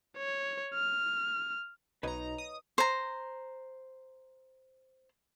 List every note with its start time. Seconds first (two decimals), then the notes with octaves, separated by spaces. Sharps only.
0.17 C#5
0.74 F6
2.03 B1 D#4 B4 C#5 D#5 A#5
2.38 D#6
2.78 C5 A#5